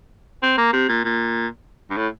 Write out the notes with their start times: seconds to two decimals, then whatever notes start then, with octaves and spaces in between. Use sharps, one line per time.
0.43 C4
0.58 A#3
0.73 C3
0.89 A#2
1.04 A#2
1.90 G2
1.97 A2